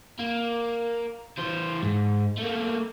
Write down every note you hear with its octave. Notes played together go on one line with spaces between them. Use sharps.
A#3
E3 C5
G#2
A3 A#3